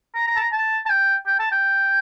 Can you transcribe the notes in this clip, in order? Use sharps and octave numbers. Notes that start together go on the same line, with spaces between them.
A#5
A#5
A5
A#5
A5
A5
G5
G5
A5
G5